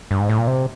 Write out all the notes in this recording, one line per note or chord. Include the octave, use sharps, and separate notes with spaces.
G2
G#2
A2
A#2
C3